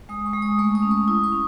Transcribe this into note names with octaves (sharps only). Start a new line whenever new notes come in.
G#3 D#6
C#6
G#3
D#6
A3 C#6
D#6
C#4
C#6
E4 D#6
C#6
C#4